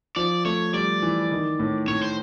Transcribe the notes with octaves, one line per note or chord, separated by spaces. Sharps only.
F3 D5
A3 C#5
G3 D5
E3
D#3
A2
A2 C#5
C5